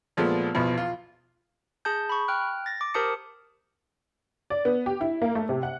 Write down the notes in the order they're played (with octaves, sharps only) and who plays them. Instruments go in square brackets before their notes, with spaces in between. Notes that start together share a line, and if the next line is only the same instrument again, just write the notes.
[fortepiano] A#2 F3 G#3 A3 B3
B1 E2 B2 F3
F4
[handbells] G#4 A5 G6
B5 C#6
G5 F6 F#6
A6 A#6
D6
G4 A#4 C5 A5 D#6 C#7
[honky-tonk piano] D5
B3
G4
E4
A#3
A3
C3
F#5